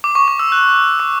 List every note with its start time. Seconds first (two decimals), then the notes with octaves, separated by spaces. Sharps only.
0.04 D6
0.15 C#6
0.28 D6
0.39 E6
0.52 F#6
1.00 D6